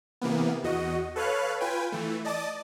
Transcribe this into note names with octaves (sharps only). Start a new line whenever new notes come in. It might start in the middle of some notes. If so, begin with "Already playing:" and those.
C3 E3 A#3 B3
E2 F#4 D#5
A4 B4 C#5 F5 F#6
F4 B4 G5 G#5
E3 A3
D5 D#5 A5 D6 D#6 A6